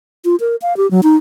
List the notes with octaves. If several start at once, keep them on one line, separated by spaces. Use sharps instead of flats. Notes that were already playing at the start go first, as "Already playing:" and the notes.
F4
A#4
F5
G4
F#3
D#4